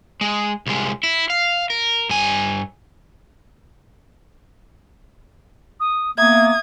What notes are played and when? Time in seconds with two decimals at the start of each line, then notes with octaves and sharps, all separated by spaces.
0.21 G#3
0.67 C2 G#3
1.03 E4
1.30 F5
1.70 A#4
2.10 G2 G#5
5.79 D#6
6.18 A#3 B3 E5 D#6 G#6